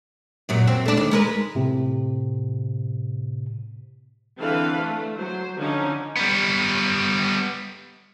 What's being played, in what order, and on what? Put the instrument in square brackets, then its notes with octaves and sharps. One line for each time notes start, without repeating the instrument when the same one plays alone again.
[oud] F#2 A#2 F#3
C4
A3 D4
D#2
G#3 A#4 B4
[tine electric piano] A2 C3
[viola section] D3 E3 C4 A4 B4 F5
A3
F#3 C5
D3 F3 C#4 D#4
[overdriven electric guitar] G3 B3